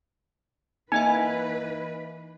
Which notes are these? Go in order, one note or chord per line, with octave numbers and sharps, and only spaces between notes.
E3 A#3 D#4 B4 D#5 E5 G#5